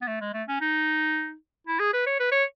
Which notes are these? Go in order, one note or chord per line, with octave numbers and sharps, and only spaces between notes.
B3
A3
G#3
A3
C#4
D#4
E4
G#4
B4
C#5
B4
C#5